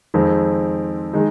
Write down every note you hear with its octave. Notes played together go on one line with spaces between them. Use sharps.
F2 D#3 G#3 C4
D#3 G#3 D#4